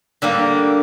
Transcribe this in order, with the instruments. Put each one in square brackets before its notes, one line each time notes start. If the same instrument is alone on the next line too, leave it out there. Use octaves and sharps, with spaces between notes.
[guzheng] D3 G3 A#3